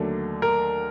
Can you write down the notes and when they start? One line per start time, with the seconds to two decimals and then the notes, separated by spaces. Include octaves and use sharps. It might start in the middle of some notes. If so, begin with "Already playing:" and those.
Already playing: D#2 D3 F#3 A3 D4
0.42 A#4